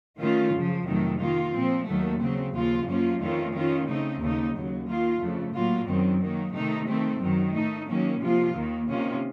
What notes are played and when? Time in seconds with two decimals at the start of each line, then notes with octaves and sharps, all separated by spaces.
0.20 D#3 A3 C#4 F4
0.54 F#2 C#3 F3
0.87 F2 C3 D#3 F#3 A3
1.20 D#3 A#3 F4
1.54 A#2 F3 C4
1.87 D#2 D#3 F#3 A3
2.20 C#3 F#3 C4
2.54 D#2 C#3 F3 A#3 F4
2.87 F#2 F3 A#3 C#4 F4
3.20 F2 D#3 A3 C#4 F4
3.54 D#3 A3 C#4 F4
3.88 C#3 A3 C4 D#4
4.20 D#2 C#3 A3 D#4
4.54 D#2 C#3 F#3
4.87 D#3 A#3 F4
5.21 F2 C#3 A3
5.54 A2 F#3 A#3 F4
5.88 F#2 D#3 F#3 C4
6.21 D#3 F#3 A#3
6.54 C3 D#3 A3 D#4
6.87 D#3 A3 C4
7.21 F#2 D#3 F#3
7.54 A2 A3 D#4
7.88 D#3 F#3 A#3 C#4
8.21 C3 F3 A#3 F4
8.55 D#2 D#3 A#3
8.88 C3 D#3 A#3 C#4 F4